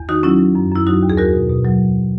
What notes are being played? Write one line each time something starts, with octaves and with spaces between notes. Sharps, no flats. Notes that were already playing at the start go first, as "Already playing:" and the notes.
Already playing: E2
D#3 D#4 F#4
F#3 C#4 E4
F#3
F#2
F#2 E4
F#3 D#4 F#4
D#2
G#4
E2 F#4 A#4
B2
B2
F#3